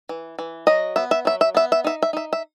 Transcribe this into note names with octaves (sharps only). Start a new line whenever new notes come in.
E3
E3
F#3 D#5
B3 E5
E5
F#3 E5
E5
B3 E5
E5
D#4 E5
E5
D#4 E5
E5